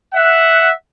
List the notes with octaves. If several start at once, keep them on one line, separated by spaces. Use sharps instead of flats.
E5 F#5